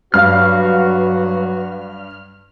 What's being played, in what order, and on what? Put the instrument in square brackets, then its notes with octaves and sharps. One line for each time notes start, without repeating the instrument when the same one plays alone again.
[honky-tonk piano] G2 F5 [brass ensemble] F#3 F#4 [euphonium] B4 [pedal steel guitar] F6